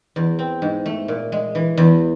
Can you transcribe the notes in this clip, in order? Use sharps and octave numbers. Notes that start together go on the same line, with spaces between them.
E2
C4
G#2
A3
A#2
G#3
E3
E2